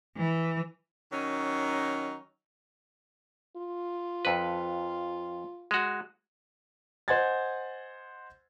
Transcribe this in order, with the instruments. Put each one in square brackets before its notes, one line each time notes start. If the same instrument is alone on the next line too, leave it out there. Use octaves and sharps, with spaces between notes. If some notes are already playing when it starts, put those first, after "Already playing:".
[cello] E3
[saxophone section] D#3 F#3 C#4 D#4
[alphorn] F4
[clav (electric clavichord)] F2 B4
G#3 F#4
[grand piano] C5 D#5 F#5 G#5 G#6 A6